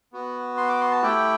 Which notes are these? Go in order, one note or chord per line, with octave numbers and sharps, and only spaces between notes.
B3 F#4
C6
D6
C6
A5
A3 E4 G4 G5